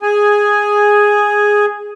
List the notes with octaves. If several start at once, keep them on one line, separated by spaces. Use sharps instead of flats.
G#4 G#5